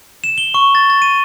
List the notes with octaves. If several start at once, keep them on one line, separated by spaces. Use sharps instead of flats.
E7
G7
C#6
A6
A6
D#7